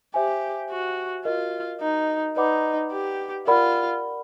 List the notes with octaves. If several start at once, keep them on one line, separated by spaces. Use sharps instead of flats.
G4 C5 E5 G#5
F#4
F4 F#4 A#4 D#5
D#4
D#4 B4 D5 F#5 B5 D6
G4
F4 A#4 D5 F#5 B5